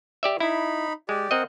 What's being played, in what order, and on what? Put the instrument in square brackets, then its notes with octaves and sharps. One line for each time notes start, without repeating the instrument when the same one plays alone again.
[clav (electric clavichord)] G4 D5 E5
[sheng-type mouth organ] D#4 B5 [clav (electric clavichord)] E4
[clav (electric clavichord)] G#3 [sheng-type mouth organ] G4 D5
[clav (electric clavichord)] C4 D#5 [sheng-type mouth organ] A#4 F#5